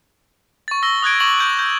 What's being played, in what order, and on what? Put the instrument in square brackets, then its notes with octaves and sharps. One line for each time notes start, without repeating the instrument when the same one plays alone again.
[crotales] C#6 A6
C#6 E6 A#6 G7
D#6 F#6 G#6 D7
C#6 D6 A#6 F#7
G6 D7
G6